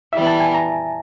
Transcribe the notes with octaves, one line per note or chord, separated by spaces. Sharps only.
E3 G3 B3 E5
A5
G#5
A#5